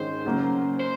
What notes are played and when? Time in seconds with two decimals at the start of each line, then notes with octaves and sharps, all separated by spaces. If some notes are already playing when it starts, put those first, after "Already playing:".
Already playing: G#2 D#3 G#3 C#4 C5
0.25 C#3 F#3 A#3 C#4
0.80 C5